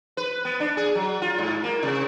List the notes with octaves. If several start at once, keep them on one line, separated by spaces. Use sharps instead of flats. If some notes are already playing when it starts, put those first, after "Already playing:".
B4
B3
D4
G#4
F#3
F4
G#2
A#3
C3